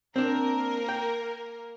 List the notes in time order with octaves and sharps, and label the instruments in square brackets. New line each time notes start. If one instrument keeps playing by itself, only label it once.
[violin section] A#3 A#4 [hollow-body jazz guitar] C4 D4
[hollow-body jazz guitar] G5